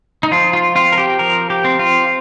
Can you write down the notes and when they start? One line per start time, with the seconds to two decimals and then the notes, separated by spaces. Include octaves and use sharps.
0.23 D#4
0.31 F3 F4
0.53 F4
0.75 C4 F4
0.92 A#4
0.98 G4
1.19 F3 A#4
1.50 G4
1.64 C4
1.79 F4